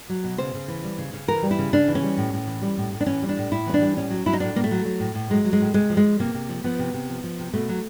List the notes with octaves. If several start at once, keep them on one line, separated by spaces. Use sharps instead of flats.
F#3
B2
C#3 C5
C#3
E3
G3
C#3
C#3
E3 A#4
G3
E4
C#3
C#3 D4
E3
C#4
G3
A2
A2
E3
G3
A2
A2
D4
E3 C#4
G3
D4
A2
A2 E4
E3 C#4
D4
G3
A2 C#4
F#3
F#3 E4
D#4
A2 D4
A2 A#3
A3
F#3
F#3
A2
A2
F#3 G#3
F#3
G#3
A2
C3 G#3
F3
G#3
F3
C3 A#3
C3
F3
F3 B3
C3
C3
F3
F3
C3
B2 A3
F#3